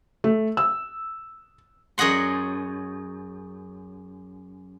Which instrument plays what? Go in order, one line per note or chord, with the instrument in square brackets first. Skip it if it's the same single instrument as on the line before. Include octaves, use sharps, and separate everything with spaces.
[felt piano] A3
E6
[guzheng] F#2 G#4 D#5 F#5 C6